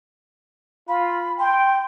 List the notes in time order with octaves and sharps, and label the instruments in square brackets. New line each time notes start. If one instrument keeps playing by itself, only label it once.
[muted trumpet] F4 [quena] B5
[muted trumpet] G5 [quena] C6